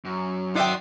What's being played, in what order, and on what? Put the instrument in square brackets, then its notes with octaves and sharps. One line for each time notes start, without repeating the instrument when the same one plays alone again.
[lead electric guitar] F#2
[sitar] D#3 D5 E5 [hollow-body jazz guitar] D#4 G5 [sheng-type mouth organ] F#5 C6 D#6